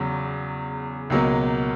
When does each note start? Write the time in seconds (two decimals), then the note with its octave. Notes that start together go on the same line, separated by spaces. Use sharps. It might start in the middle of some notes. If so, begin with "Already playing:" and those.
Already playing: E2 C#3 F#3
1.10 C#2 B2 F#3 A#3